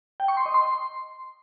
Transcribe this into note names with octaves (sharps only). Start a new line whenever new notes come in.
G5
C#6
C6
D#5
C6